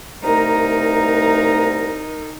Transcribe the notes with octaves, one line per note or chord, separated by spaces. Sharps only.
C2 B2 A3 D#4 A#4 A#5